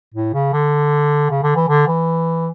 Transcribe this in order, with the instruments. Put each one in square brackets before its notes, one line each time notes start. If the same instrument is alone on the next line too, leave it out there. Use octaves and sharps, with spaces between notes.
[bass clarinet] A2
C#3
D3
C#3
D3
E3
D3
E3